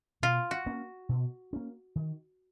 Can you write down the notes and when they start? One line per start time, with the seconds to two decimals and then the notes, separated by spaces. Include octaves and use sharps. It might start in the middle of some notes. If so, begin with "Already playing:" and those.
0.22 B2 F4
0.51 F#4
0.66 A#3 C#4
1.09 B2
1.53 A#3 C#4
1.96 D#3